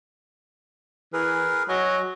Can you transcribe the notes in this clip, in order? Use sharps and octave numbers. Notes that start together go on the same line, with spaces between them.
E3 G#4 A#4 B4
F#3 D#5 G#5